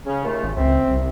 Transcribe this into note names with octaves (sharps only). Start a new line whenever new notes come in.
C#3 C#4
D#2 A3 F4
G#1
C#2 C4 E5
C2